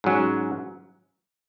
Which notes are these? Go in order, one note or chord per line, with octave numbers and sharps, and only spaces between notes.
G#2 F#3 C#4